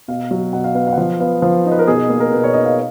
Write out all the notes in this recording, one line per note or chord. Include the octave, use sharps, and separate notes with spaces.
B2 F5
F#3
B2 F#5
F5
B3 F5
F5
F#5
F3 F5
B3 F5
F3 F5
D#4
B4
A#4
B2 G#4
A#3
A#4
B2 B4
C#5
D#4 D#5
F5